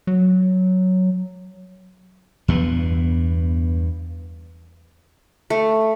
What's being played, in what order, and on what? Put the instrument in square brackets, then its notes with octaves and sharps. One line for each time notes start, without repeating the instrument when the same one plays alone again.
[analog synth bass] F#3
[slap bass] E2 G2 B3
[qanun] A3